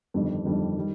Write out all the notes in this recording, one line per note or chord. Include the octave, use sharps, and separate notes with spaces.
G1 F2 D#3 G3 D4
G1 F2 D#3 G3 D4
D#3 G3